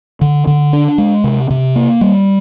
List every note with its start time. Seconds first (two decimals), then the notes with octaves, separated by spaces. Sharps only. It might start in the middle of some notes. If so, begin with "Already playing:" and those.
0.21 D3
0.47 D3
0.73 D4
0.98 G#3
1.24 C3
1.50 C3
1.76 A#3
2.01 G3